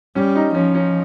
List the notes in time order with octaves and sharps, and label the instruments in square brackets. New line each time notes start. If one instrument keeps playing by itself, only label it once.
[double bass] G3 [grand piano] C#4
[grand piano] D#4
[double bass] F3 [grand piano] C#4
[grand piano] C#4